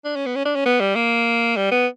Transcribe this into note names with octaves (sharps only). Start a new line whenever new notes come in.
D4
C#4
B3
C#4
D4
C#4
B3
G3
A#3
G3
B3